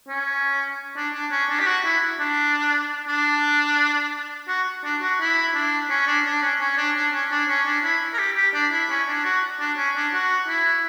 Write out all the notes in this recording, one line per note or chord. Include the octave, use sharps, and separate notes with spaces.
C#4
D4
D4
C#4
D4
G4
F#4
E4
D4
D4
F#4
D4
F#4
E4
D4
C#4
D4
D4
C#4
C#4
D4
D4
C#4
D4
C#4
D4
E4
A#4
G4
G4
D4
E4
C#4
D4
F#4
D4
C#4
D4
F#4
E4